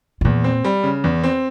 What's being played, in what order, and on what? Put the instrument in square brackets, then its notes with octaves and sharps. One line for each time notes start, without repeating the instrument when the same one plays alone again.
[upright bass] G#2
[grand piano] E2 [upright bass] A#2
[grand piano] C4
G3
C#3
E2
C4